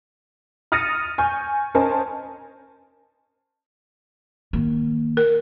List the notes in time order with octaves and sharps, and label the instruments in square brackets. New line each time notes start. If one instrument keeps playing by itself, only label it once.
[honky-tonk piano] D#6 F6 A6 A#6 C#7 D#7
G#5 C#6 G6
C#4 A#4 C5 D#5 G#5 A5
[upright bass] D#3 A#3
[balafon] A#4